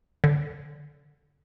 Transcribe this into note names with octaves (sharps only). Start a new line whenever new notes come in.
D3